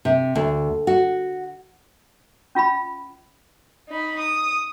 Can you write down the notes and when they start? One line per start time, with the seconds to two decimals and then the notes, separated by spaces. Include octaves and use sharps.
0.05 C3
0.35 D2
0.87 F#4
2.55 C#4 F4 F5 B5
3.89 D#4 B5
4.20 D#6